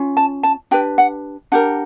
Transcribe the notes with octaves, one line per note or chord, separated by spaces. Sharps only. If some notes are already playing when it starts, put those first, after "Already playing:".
Already playing: C#4 F4
A5
A5
D4 G4 B4 G5
F#5
D4 G4 A#4 F#5